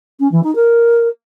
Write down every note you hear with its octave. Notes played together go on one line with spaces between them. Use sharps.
C#4
E3
D#4
A#4